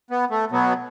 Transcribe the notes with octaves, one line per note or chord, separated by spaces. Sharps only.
B3
A3
B2 F#3 B3